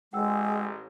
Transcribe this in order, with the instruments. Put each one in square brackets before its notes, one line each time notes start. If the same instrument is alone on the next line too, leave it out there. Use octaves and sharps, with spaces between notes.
[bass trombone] A1 [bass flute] G#3 [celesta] F#5 G5 E6